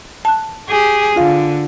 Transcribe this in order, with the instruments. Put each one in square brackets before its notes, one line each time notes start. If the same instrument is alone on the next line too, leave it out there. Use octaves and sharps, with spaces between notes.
[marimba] A5 F#6
[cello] G4 G#4
[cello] D3 [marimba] F4 F5